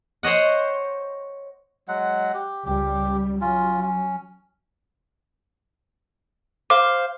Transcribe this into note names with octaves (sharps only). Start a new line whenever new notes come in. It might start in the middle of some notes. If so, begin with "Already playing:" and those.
C5 C#5 D#5 F#5
F#3 G#3 F#5
G4
C#2 G3 G4
F#3 C#4 F4
C#4
C5 F5 D6